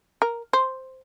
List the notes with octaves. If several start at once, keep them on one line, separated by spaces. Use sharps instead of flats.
A#4
C5